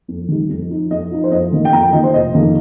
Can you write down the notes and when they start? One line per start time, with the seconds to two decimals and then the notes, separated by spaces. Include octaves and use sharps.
0.08 F2
0.29 D#3 G3 D#4
0.50 F2
0.70 F3 D#4
0.91 F2 D#5
1.11 F3 D#4
1.24 C5
1.31 F2 D#5
1.52 D#3 A#3 F4
1.65 G5
1.73 F2 A#5
1.83 G5
1.93 D#3 A#3 F4 D#5
2.04 C5
2.14 F1 D#5
2.34 F2 D#3 A#3 D#4